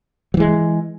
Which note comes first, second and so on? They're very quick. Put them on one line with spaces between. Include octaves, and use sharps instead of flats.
F#3 E3 G#3